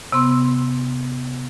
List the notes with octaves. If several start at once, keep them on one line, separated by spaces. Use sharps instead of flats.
C3 B3 C6